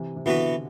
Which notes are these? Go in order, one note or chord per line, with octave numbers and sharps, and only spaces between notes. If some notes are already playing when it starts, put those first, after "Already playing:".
Already playing: C3 E3
C3
B2 D3 E3 B3 F#4 B4